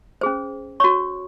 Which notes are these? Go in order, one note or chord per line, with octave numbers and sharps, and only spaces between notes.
C#4 G#4 C5
F#4 C#5 C#6